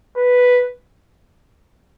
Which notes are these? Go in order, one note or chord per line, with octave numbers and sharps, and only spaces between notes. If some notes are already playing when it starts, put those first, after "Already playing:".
B4